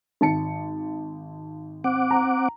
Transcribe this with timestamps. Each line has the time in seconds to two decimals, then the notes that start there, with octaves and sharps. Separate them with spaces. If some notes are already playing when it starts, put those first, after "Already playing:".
0.21 G#1 A5 C#7
1.84 C4 F#5 D6
2.11 A#5